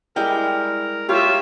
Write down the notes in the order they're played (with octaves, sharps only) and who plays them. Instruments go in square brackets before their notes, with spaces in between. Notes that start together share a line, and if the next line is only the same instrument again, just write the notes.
[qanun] G3 G#3 E4 [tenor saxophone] A#4 [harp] G5
[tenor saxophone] F4 [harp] G4 [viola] C#5 E5